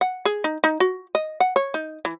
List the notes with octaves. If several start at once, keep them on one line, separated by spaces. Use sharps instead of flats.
F#5
G#4
D#4
D#4
F#4
D#5
F#5
C#5
D#4
E3